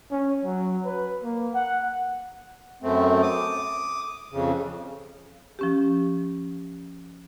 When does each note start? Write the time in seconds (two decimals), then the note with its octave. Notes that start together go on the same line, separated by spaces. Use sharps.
0.12 C#4
0.45 F#3
0.85 B4
1.23 A#3
1.54 F#5
2.83 F#2 A3 C4
3.22 D6 D#6
4.32 F2 C#3
5.59 F3 C#4 G4